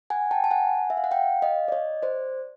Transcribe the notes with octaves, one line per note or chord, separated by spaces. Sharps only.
F#5 G#5
G5 A5
A5
F#5 G#5
E5
F5
F#5
F5 G5
D#5 F5
D5
C#5 D#5
C5 D5